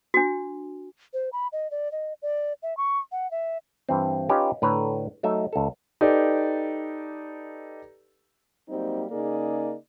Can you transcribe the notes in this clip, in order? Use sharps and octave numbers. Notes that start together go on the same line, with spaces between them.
D4 F#4
C5
B5
D#5
D5
D#5
D5
E5
C#6
F#5
E5
G2 E3 C4
C#4 D#4 F4 G4 B4
A2 D3 B4 C#5 A#5
F#3 A3 D#4 E5
C#2 A4
D#4 G4 A4 B4 D5
F#3 G3 A#3 C4 D#4
C#3 A#3 D#4 G#4 D5